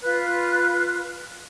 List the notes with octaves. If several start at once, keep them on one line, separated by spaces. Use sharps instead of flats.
F4 B4 F#6